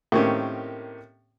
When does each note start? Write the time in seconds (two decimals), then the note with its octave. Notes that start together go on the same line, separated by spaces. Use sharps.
0.12 A2 D#3 A#3 C4 C#4 G4